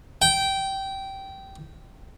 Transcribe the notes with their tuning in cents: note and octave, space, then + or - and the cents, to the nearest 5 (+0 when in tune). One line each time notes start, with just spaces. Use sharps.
G5 -15